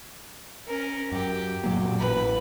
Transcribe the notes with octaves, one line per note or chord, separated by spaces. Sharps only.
C#4 A#4
F#2 G4
A#2 F#3 A#3
A1 B4